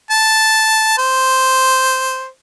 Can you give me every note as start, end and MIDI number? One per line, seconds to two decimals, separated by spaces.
0.10 0.96 81
0.98 2.27 72